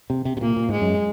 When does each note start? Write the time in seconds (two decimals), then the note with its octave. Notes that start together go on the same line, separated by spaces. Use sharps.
0.10 C3
0.25 C3
0.37 C3
0.41 A#2 A#3
0.57 A#2
0.69 G#2 G#3
0.81 F#2